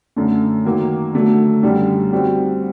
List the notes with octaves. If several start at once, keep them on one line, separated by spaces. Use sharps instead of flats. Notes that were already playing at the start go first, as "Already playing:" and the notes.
F#2 D3 A3
D#3 F#3 A#3
D3 F#3 A3
F#2 D3 G3
G3 C4 F#4